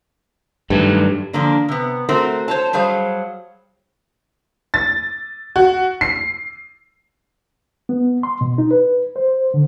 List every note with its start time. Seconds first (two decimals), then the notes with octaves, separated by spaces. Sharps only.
0.70 G2 D#3 F#3 A3
1.33 D3 F3 A#3 D4
1.68 C3 B3
2.09 A3 C4 F#4 A#4 C5
2.48 C5 C#5 A5
2.73 F#3 G3 G#4 C5 F5
4.74 A6
5.56 F#4
6.01 C7
7.89 B3
8.23 C6
8.41 B2
8.58 D#4
8.71 B4
9.16 C5
9.54 D3